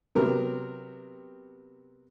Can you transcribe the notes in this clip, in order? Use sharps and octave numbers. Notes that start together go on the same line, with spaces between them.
C3 F#3 B3 G4 A#4